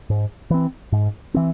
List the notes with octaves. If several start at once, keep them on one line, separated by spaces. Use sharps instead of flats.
G#2
E3 C4
G#2
E3 C4